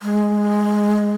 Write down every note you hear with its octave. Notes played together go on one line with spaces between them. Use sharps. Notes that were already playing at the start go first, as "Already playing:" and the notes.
G#3